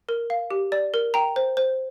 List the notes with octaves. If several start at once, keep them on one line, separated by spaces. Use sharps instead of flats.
A#4
F5
G4
D5
A#4
G5 A#5
C5
C5